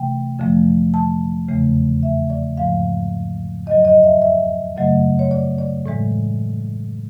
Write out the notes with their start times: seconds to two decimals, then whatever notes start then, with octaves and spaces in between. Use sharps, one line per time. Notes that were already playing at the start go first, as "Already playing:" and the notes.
Already playing: C3 E3 A3 G5
0.39 F2 D3 F3 A3
0.94 A5
1.48 E2 C#3 E3 A3
2.03 E5
2.30 D5
2.57 G#2 F3 G#3 F5
3.66 F2 D3 F#3 D#5
3.85 D#5
4.04 E5
4.22 E5
4.76 F#2 C#3 F#3 A3 D#5
5.19 C#5
5.31 D5
5.58 D5
5.86 A2 E3 G#3